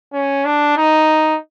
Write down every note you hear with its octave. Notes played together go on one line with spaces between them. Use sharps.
C#4
D4
D#4